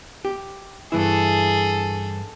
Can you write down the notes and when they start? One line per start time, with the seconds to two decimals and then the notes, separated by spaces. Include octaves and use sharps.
0.25 G4
0.92 G2 E3 E4 G#4 A4